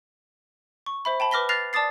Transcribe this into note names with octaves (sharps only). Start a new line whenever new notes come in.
C#6
C5 E5 B5
G5 A5 B5
B4 D6 F6 A#6 B6 G7
F6 F#6 A6 A#6 C7 F7
D5 A5 D6 D#6 A6 C7